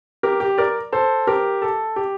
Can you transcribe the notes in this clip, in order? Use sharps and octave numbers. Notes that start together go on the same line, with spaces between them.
G4 A#4
G4
A#4 D5
A4 C5
G4 A#4
A4
G4